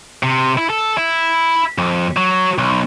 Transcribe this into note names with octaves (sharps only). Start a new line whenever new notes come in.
C3
E4
A4
E4
F2
F#3
B1